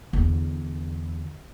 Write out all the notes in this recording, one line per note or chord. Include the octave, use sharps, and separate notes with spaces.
E2 D3